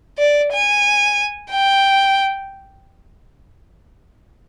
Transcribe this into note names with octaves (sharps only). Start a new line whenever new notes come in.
D5
G#5
G5